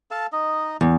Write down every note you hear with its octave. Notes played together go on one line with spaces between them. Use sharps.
A4 F5 A5
D#4 D#5
E2